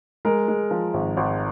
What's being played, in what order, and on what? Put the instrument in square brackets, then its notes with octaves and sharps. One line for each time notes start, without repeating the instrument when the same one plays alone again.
[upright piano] G#3 A#4
G#3
F3
G#1
G#1